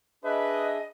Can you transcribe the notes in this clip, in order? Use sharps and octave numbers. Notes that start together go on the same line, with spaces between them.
D4 G#4 B4 D#5 E5